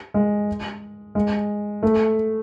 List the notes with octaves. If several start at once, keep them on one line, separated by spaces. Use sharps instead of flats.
G#3
G#3
A3